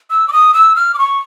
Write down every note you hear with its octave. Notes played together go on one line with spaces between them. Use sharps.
E6
D6
D#6
E6
F6
D6
C#6